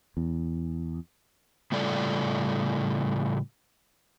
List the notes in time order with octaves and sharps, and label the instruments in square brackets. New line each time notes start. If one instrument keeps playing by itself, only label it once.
[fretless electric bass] E2
[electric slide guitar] A2 C#3 G3 F4 A4 D5